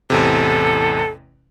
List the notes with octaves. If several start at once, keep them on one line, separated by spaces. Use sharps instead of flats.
A1 E2 C3 A4